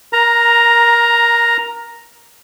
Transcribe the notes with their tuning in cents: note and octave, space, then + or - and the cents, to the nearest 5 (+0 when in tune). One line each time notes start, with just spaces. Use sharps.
A#4 +20 A#5 +0